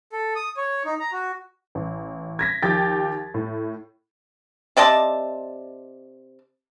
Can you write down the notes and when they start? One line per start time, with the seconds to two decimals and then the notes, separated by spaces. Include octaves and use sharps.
0.12 A4
0.36 D#6
0.57 C#5
0.85 D#4
1.00 A#5
1.12 F#4
1.75 A1
2.39 G#6 A#6 B6
2.62 D#2 F3 G4 G5 A6
3.34 A2
4.77 C3 D5 D#5 A5